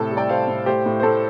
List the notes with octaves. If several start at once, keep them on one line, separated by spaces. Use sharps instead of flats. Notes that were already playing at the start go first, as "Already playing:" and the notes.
Already playing: A2 C3 A4
G3
D5 G5
G3 C5 F5
A2
A3 G4 C5
A2
C5
A2 A4